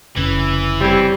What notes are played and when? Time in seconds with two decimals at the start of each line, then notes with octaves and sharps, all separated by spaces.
0.17 F1 C#3 E3
0.81 G3 C4 C#5